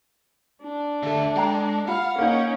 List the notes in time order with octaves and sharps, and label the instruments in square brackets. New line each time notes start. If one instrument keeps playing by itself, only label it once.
[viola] D4
[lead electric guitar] D3 A3 [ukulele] A4 E5
[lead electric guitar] G#3 [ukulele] A4 G5 A#5
[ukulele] F4 B5 [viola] F5 [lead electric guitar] F#5
[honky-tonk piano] A#3 D#4 [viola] C#4